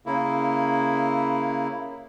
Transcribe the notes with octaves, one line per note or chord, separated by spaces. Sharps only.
C#3 A#3 E4